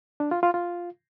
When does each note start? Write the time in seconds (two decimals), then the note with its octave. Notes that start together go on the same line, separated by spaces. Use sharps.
0.20 D4
0.31 F4
0.43 F4
0.54 F4